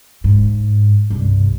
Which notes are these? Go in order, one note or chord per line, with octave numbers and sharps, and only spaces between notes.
G#2
C2 G2